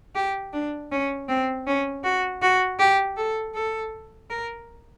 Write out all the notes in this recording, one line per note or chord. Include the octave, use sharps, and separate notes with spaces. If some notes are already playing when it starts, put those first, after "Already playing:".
G4
D4
C#4
C4
C#4
F#4
F#4
G4
A4
A4
A#4